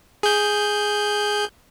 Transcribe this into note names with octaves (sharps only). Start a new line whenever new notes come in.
G#4 G6